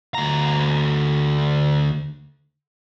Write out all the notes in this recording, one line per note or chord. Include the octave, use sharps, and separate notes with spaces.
D2 A#5